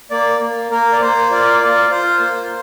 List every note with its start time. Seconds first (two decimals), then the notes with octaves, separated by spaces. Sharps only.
0.11 A#3 D5
0.41 A#3
0.71 A#3 A#4
0.93 D5
1.01 A#3 C5
1.31 F4 D5
1.60 F4 D5
1.90 F4 C5
2.20 A#3